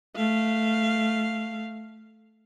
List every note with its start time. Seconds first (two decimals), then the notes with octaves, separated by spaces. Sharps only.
0.16 A3 F5